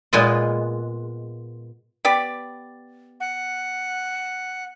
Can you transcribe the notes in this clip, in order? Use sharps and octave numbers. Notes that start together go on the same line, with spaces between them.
A#2 G#3 B3 F4
B3 G4 D5
F#5